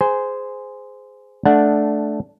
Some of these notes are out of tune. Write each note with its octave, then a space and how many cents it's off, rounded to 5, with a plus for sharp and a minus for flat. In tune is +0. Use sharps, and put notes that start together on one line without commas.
G#4 +0 C5 -20 G#5 +0
A3 -15 D4 +0 F#5 -15